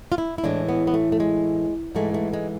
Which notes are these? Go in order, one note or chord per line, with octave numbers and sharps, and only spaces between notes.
F4
E4
E4
A2 E3 G#3 D4
B3
B3
A3
A3
G#3
G#2 E3 G#3 A3
A3
G#3